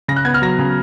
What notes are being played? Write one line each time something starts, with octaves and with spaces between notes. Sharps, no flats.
C#3 A#6
F#6
B3 G#6
F6
F#3 A#6
C#3